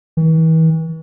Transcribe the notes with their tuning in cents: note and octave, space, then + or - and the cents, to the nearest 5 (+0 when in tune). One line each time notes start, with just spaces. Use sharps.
E3 -40